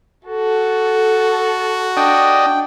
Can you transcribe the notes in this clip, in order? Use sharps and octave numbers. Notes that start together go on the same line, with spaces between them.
F#4 A4
D4 D#5 G5